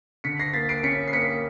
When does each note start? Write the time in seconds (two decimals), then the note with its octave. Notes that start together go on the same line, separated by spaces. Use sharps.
0.24 D3 B6 C#7
0.39 A#6 C7
0.53 A#3 A6 B6
0.69 C7 D7
0.83 C#4 B6 C#7
1.08 C7
1.13 A#3 B6 C#7